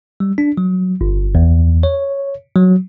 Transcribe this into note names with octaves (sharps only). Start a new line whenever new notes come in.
G3
D4
F#3
G1
E2
C#5
F#3